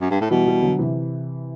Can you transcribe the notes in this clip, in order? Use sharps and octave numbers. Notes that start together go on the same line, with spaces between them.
F#2
G2
A2
B2 E3 G3
E3 G3
D3 F#3
C3 E3